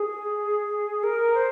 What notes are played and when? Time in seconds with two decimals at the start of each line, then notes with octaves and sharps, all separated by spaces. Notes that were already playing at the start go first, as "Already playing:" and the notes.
Already playing: G#4
1.03 A#4
1.34 C5